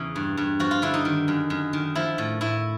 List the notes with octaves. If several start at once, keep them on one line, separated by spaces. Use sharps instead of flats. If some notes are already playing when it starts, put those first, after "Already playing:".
Already playing: E2 C#3 E3
G2
G2
F3 F#4
F4
D3 E4
D#4
D#3
F#2
F#2
D#3
F3 E4
A2
A2 E4